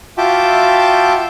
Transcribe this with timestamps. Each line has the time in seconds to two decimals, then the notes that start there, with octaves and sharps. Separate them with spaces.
0.18 F4 F#4 E5 G5 A5 D6